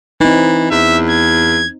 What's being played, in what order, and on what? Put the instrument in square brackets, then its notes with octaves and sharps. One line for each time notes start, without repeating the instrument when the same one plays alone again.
[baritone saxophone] E3 [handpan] C4 D#4
[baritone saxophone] E2 [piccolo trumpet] E5
[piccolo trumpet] G#6